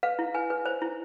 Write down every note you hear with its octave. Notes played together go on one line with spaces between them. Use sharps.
B4 F5
E4
B4 G#5
B4
C5
E4